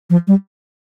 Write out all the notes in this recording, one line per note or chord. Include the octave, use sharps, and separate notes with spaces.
F3
G3